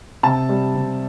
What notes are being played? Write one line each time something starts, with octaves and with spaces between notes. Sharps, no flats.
C3 A5
G3
C3